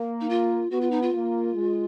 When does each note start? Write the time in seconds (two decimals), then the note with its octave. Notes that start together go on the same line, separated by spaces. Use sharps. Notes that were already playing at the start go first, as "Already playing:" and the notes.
Already playing: A#3
0.21 D#4
0.29 F4
0.71 B3 F#4
0.81 F4
0.91 D#4
1.02 F4
1.13 A#3
1.54 G#3